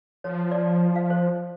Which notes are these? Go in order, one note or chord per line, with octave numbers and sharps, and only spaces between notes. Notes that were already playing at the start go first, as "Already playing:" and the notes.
F3 C#5
D5
F5
C5